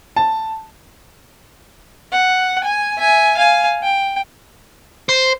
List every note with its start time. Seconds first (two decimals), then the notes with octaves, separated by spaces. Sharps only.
0.16 A5
2.12 F#5
2.64 G#5
2.98 E5 G#5
3.37 F5 G#5
3.82 G5
5.09 C5